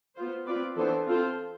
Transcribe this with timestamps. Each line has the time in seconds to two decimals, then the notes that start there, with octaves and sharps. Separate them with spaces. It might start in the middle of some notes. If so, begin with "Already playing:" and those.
0.17 B3 F4 C5
0.47 C4 F4 B4 D5
0.77 E3 B3 D4 A4 C5
1.06 C4 F4 A4 C5